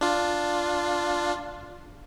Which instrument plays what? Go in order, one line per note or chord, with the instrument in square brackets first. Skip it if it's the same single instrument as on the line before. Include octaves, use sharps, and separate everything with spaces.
[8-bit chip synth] D4 F4